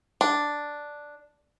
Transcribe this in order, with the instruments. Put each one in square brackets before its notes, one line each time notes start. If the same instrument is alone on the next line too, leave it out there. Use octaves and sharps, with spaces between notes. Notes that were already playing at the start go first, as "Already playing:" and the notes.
[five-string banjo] D4